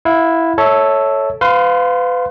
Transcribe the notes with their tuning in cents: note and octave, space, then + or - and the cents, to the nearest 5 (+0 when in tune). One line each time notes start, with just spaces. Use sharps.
E4 +0 F5 +25
A4 +0 C#5 +0 E5 -25
B4 +35 F5 +10 C6 +0